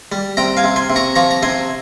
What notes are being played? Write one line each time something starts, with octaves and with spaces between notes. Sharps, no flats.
G3
C3 G5 A#5
F5 G#5
C3
G#5 C6
C3
A#5 C#6
F3 A#5 C#6
A#5
C3 G#5 C6